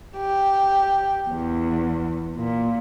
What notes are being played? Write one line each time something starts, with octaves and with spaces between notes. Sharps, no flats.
G4
E2
A#2